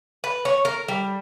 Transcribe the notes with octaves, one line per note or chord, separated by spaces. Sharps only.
B4
C#5
A#4
G3